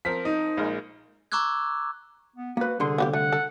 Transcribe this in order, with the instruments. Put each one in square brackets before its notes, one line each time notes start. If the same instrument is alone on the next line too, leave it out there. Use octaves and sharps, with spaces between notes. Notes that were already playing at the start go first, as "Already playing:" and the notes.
[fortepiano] F3 C4 A#4 [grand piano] B6
[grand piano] D#4
[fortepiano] A#1 G#3 A#4
[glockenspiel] A#5 C#6 D6 E6 F#6 G#6
[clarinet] B3
[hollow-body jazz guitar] A#3 B4 [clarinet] F#4
[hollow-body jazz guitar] C2 D3 C6 [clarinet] G#4
[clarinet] A#3 [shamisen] B3 F#4 G4
[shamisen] A3 [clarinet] F#5
[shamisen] A4